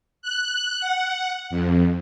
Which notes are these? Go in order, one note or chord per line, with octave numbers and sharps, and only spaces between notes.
F#6
F#5
F2